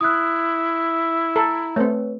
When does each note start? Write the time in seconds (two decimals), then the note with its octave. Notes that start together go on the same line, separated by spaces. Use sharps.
0.01 E4 D#6 F#6
1.36 A4 A#5
1.76 A3 C4 B4 C#5